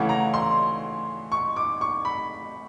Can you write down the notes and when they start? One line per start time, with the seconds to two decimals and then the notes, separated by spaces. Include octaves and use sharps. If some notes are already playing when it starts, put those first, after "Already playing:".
Already playing: C#3 E3 A3 F#5
0.09 A#5
0.34 C6
1.32 C#6
1.56 D6
1.81 C#6
2.05 B5